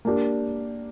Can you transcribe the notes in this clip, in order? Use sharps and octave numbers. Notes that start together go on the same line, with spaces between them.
A#3 D4 G4